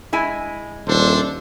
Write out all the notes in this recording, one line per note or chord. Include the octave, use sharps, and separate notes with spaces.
G#3 E4 G#5
D#1 D4 A4 C5